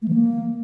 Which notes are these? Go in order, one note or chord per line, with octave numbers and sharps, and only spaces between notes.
A3
E3
A#3